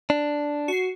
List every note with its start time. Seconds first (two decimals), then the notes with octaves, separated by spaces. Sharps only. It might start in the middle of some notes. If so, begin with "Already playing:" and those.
0.10 D4
0.68 F#4 C7